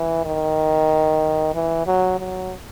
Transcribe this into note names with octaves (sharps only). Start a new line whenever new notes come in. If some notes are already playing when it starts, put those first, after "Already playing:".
Already playing: E3
D#3
E3
F#3
F#3